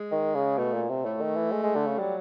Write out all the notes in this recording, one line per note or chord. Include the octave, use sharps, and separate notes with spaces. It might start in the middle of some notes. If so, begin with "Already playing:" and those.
Already playing: G#3
D#3
C#3
B2 A3
A#2
C3
A2 A3
D#3
E3
G#3
G#3
D3
C#3
F#3 G3